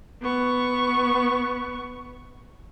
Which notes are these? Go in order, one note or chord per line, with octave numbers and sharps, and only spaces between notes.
B3 C#6